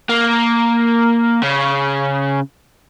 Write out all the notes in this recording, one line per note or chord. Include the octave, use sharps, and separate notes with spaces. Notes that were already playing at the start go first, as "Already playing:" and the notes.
A#3
C#3